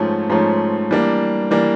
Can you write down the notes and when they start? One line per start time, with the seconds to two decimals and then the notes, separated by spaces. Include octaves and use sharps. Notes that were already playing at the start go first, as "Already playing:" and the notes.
Already playing: G#2 F3 A3 C#4
0.30 G#2 F3 A3 C#4
0.91 E3 G3 A#3 D4
1.51 E3 G3 A#3 D4